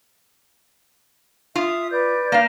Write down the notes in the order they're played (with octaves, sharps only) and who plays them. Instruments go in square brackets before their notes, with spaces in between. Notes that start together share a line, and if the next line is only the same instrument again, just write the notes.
[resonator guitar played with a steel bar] F4 [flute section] E5 D#6
[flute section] B4 D5 G6
[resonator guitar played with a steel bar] A#3 F5